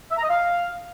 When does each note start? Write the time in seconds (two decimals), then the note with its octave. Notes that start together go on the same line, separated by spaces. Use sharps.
0.11 E5
0.17 A#5
0.23 D#5
0.29 F5